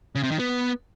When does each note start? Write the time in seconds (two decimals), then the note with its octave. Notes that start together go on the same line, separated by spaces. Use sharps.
0.15 C#3
0.23 C3
0.31 D#3
0.39 B3